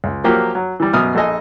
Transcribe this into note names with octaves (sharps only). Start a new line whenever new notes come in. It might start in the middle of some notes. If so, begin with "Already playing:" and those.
C#2
F3 F#3 A#3 G4 A#4
F#3
E3 G3
F#2 B2 D#6 F6
A#1 A4 D#5 G#5